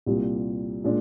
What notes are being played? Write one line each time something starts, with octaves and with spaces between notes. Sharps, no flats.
C2 A#2 G3
A#2 G#3 D4